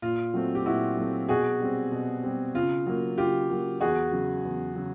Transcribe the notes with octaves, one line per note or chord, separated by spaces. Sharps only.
A#2 F4
F#3 A3 C4
G4
A#2 E4 F#4
F#3 A3 C4
B2 F#4 G#4
G3 C4
B2
G3 C4
C#3 F4
F#3 A#3
C#3 F4 G4
F#3 A#3
E2 F#4 G#4
C#3 F#3
E2
C#3 F#3